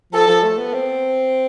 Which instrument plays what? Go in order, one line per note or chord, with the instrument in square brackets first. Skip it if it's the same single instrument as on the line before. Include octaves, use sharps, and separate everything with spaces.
[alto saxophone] F3 [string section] A4
[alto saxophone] F3
A3
B3
C4